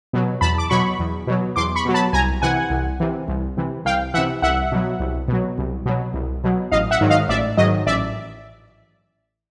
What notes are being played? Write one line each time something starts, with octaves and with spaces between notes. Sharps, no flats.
B2 F#3
E2 A5 B5
D6
B2 F#3 B5 C#6
E2
B2 F#3
E2 C6 D6
B5 C#6
B2 F#3
A5 B5
C2 G#5 A#5
C3 E3 F#5 G#5
C2
C3 E3
C2
C3 E3
C2 F5 G5
C3 E3 E5 F#5
C2 E5 F#5
B2 F#3
C2
B2 F#3
C2
B2 F#3
C2
B2 F#3
A1 D#5 F5
E5 F#5
G#2 D#3 F#3
D#5 F5
A1 D5 E5
G#2 D#3 F#3 D#5
A1 D5 E5